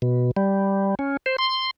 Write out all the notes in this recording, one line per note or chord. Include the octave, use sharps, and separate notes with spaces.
B2
G3
C#4
C5
C6